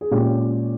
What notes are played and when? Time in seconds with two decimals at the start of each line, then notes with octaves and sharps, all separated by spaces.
0.01 G#4
0.11 A#2 G#3 C#4 G4